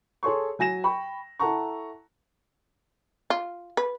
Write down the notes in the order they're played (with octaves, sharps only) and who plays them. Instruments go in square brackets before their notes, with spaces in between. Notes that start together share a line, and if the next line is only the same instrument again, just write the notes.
[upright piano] G#4 A4 C#5 C6 C#6
F#3 G#5 A#6 E7
G5 B5 C#6
E4 A4 F#5 A5 A#5 C#6
[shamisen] F4
B4